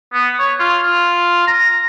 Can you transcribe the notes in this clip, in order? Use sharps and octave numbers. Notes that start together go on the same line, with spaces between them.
B3
C#5
F4
F4
A#5